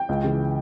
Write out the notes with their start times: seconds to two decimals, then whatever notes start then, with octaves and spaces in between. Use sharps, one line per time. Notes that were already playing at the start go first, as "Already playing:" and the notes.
Already playing: G5
0.09 C#2
0.24 C#3 E3 G#3